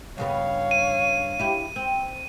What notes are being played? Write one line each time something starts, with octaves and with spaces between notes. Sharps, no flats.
G2 C#3 B3 C#5 F5
D#7
E4 G4
C4